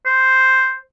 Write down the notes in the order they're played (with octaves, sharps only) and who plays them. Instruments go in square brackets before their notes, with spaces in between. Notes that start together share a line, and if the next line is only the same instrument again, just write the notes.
[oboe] C5